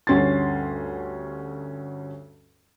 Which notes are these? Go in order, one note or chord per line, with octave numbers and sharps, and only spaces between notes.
D2 G2 C#4 C6 A6